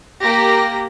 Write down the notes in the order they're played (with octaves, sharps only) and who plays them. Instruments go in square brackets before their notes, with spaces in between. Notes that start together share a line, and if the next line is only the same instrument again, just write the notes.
[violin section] A#3 G4 A#6